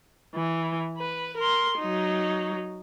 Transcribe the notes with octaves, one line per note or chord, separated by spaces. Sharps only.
E3
B4
A#4 C6
F#3 D#4